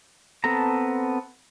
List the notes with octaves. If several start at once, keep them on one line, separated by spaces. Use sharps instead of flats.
B3 C4 A4 A5 A#5